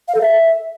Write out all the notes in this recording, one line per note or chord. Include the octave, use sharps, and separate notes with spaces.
F5
A4
E5